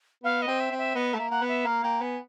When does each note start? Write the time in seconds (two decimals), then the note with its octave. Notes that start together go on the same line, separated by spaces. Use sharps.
0.24 B3 F5
0.42 D#5
0.48 C4
0.60 E5
0.72 C4
0.78 E5
0.95 B3 D#5
1.13 A3 E5
1.19 A#3
1.30 A#3 F#5
1.42 B3
1.48 E5
1.66 A#3 F5
1.84 A#3 G5
2.02 B3 G#5